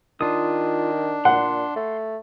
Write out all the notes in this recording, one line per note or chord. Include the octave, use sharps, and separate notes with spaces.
D#3 D4 F4 D#6
A#2 F#5 C6
A3